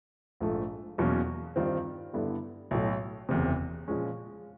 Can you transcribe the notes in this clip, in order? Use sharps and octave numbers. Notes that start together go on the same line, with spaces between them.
A#1 G#2 F3 A3
E2 B2 F#3 A#3 C#4
G2 D#3 G3 C4 F4
G2 D3 G3 B3 E4
B1 A2 F#3
F#1 E2 C3
A#2 F3 G#3 C#4